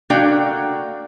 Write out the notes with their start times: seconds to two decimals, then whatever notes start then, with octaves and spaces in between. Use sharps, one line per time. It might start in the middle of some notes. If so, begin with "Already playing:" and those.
0.10 A3 A#3 D4 F#4 F5 G5